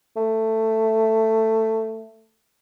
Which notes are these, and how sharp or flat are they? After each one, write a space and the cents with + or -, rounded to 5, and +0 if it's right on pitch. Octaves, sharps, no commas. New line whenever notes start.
A3 +10